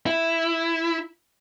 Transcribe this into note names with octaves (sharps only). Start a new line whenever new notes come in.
E4